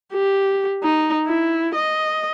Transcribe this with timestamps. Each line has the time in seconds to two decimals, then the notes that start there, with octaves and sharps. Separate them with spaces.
0.13 G4
0.83 D#4
1.26 E4
1.75 D#5